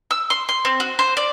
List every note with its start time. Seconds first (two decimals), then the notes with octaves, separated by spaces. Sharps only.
0.11 E6
0.30 C6
0.49 C6
0.65 C4
0.80 F#4
0.99 C5
1.17 D5